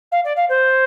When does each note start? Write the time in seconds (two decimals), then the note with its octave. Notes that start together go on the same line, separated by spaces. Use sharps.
0.12 F5
0.24 D5
0.36 F5
0.49 C5